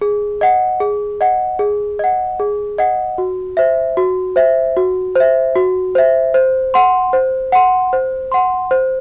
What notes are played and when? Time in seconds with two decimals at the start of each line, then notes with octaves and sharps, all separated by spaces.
0.01 G#4
0.41 D#5 F#5
0.80 G#4
1.21 D#5 F#5
1.59 G#4
1.99 D#5 F#5
2.39 G#4
2.78 D#5 F#5
3.18 F#4
3.57 C5 E5
3.97 F#4
4.36 C5 E5
4.77 F#4
5.15 C5 E5
5.56 F#4
5.95 C5 E5
6.34 C5
6.74 F#5 C6
7.13 C5
7.52 F#5 C6
7.93 C5
8.32 F#5 C6
8.71 C5